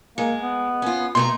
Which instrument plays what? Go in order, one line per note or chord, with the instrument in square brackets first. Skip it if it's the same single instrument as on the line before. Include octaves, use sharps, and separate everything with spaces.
[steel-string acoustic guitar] G#3 [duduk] A#3
[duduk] B3
[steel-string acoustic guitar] C#4 F4
[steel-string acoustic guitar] B2 A3 A#5 [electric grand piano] C6